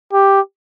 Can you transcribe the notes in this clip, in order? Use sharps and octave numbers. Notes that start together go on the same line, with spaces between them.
G4